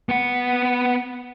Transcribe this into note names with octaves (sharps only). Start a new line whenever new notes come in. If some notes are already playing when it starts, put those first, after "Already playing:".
B3 F#5